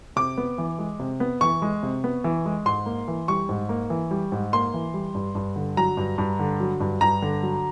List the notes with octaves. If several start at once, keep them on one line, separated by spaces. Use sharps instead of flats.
C3 D6
B3
E3
G#3
C3
B3
E3 C#6
G#3
C3
B3
E3
G#3
G#2 C6
A#3
E3
G3 C#6
G#2
A#3
E3
G3
G#2
A#3 C6
E3
G3
G2
G2
D3
F#3 A#5
G2
G2
D3
F#3
G2
G2 A#5
D3
F#3